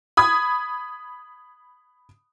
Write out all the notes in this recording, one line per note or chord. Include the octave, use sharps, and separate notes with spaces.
B5 D#6 G#6